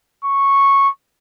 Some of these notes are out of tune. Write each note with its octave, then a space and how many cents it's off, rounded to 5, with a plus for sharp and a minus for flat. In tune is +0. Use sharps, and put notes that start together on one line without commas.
C#6 -10